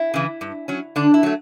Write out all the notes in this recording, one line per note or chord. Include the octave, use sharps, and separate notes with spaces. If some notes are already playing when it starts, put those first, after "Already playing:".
Already playing: E4
C#3 E3
G2
F#3 C#4
D3 D4
E4
F#3 A3